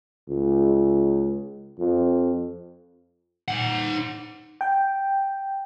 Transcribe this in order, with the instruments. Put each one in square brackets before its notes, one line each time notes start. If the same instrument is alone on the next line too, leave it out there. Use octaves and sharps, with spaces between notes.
[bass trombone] C#2
F2
[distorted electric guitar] D#4 F#5
[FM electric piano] G5